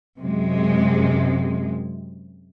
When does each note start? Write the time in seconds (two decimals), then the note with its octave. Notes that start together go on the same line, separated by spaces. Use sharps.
0.19 F#2 C3 G#3